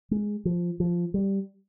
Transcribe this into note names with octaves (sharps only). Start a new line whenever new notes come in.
G#3
F3
F3
G3